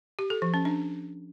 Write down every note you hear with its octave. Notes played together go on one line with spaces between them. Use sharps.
G4
A4
F3
C#4
D4